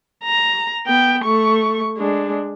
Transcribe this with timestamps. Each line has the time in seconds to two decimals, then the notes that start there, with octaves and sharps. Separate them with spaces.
0.24 A#5
0.86 B3 G5
1.24 A3 C#6
1.97 G#3 D4